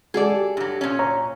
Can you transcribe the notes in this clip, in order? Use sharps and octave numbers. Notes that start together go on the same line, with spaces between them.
G#3 F#4 G#4 A4 D5
G4
G2 F#3
A#2 C#4
C#5 A#5